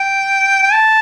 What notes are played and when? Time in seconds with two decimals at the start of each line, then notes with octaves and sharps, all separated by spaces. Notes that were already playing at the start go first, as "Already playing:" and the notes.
Already playing: G5
0.63 G5
0.72 A5